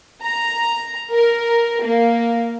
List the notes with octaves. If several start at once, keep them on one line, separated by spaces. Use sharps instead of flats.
A#5
A#4
A#3